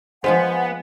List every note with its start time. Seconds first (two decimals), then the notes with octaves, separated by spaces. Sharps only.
0.24 F3 G#3 B3 F4 C5 F5 F#5 G#5